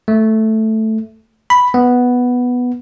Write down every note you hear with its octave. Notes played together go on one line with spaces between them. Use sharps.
A3
B5
B3